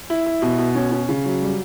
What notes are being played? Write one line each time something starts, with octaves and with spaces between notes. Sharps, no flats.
E4
E4
B2
B2
C#4
C#4
C#3
F#3
G3